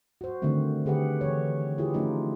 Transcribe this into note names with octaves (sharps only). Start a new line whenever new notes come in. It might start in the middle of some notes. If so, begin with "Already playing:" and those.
F#4 C5
D3 D#3 G3 A3 C4
D3 G4 G#4 B4 F#5
E3 C#5
E4 F4 G4 G#4
F3 A3 C#4 D#4 F4